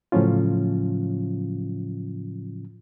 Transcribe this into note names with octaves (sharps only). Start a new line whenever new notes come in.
A2 C#3 F3 F#3 C#4 F4